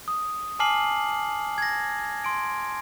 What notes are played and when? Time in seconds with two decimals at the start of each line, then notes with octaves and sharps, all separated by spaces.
0.08 D#6
0.59 G#5 A5 D6 F6 C7 F#7
1.58 G#6 A#6
2.24 C6 D7